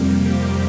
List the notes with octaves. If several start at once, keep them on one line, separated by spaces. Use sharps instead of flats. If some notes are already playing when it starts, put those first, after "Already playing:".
Already playing: F2 C3 G3 A#3
G4